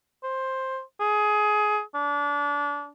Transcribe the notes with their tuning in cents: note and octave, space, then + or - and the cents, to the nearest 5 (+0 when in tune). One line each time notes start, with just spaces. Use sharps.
C5 +10
G#4 +20
D4 -25